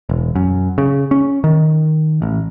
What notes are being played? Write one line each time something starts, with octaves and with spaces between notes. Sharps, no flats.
E1
F#2
C#3
C#4
D#3
A1